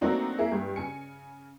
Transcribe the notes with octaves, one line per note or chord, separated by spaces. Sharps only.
F#3 A3 A#3 C4 D4 D#4
A#3 E4 G#4 E5
G2
C#3 G#5 C#7